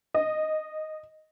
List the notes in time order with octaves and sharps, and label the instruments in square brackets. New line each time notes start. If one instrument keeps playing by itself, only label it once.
[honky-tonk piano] D#5